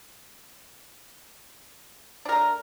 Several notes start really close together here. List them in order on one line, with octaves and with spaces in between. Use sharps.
D4 A#4 A3